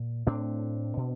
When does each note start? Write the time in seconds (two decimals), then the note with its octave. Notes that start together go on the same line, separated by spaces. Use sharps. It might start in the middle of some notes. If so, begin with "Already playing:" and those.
Already playing: A#2
0.27 A2 C4 D4
0.97 B2